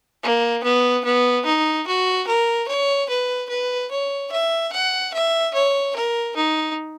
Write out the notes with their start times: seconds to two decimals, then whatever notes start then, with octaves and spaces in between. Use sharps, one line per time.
0.23 A#3
0.63 B3
1.04 B3
1.45 D#4
1.87 F#4
2.27 A#4
2.68 C#5
3.09 B4
3.49 B4
3.91 C#5
4.32 E5
4.72 F#5
5.13 E5
5.54 C#5
5.96 A#4
6.36 D#4